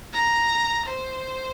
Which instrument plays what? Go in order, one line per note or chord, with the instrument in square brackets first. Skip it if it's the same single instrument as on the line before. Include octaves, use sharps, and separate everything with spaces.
[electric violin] A#5
C5